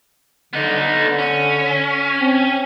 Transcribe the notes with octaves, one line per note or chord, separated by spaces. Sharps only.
D3 B3 D#4
D3
C#4
C4